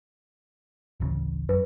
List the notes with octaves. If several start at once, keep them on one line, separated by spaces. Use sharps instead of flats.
D1 A1 C#3
F#2 B4